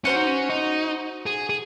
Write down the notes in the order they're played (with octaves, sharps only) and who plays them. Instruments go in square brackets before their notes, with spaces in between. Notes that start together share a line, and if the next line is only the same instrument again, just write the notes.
[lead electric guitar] C#4 [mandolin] F#4 C5 F#5
[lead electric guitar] D#4
C#4
D#4
G#4
G#4